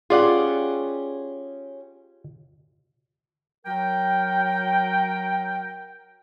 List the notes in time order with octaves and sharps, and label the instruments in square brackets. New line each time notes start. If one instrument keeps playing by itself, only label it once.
[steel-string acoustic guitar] C#4 G4 G#4 [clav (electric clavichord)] F4 D5 F#5
[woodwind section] F#3 A#4 G5